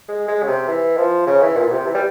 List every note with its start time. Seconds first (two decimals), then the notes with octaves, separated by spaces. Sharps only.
0.09 G#3
0.28 G#3
0.43 C#3
0.48 C3
0.68 E3
0.97 F3
1.27 C#3
1.42 E3
1.57 A#2
1.67 A#2
1.71 C3
1.86 E3
1.94 G3